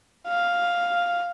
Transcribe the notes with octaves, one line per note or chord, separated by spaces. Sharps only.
F5